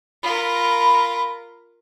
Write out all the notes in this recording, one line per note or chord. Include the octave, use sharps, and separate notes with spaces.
F4 A#4 B5